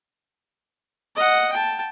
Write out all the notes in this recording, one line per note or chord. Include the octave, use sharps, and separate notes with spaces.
D#5 F#5
G5 A5